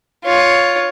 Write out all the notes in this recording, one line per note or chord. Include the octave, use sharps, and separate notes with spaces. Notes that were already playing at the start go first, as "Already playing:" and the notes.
F4 C#5